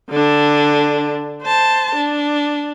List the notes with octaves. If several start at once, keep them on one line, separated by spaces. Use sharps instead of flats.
D3 D4
C5 A5
D4